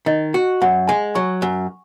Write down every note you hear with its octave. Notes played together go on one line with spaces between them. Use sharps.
D#3 D#5
F#4
F#2 F#5
G#3 G#5
F#3 C#6
F#2